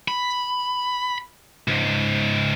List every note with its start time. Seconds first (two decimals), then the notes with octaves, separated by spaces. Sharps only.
0.08 B5
1.68 C#2 G#2